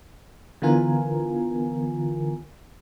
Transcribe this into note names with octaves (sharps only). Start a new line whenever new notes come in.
D3 E3 B3 F4 A#4 G#5